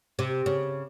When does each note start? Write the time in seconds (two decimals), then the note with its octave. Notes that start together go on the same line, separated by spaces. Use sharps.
0.19 C3
0.46 C#3